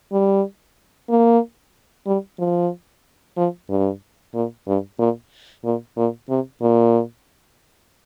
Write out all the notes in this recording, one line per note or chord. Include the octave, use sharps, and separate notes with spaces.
G3
A#3
G3
F3
F3
G2
A#2
G2
A#2
A#2
A#2
C3
A#2